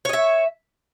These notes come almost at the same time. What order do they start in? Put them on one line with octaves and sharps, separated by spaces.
C#5 D#5 E5